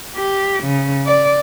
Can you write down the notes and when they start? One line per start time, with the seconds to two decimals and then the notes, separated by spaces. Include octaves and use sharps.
0.17 G4
0.64 C#3
1.07 D5